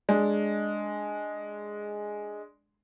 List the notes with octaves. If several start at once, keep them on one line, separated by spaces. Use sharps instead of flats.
G#3 D4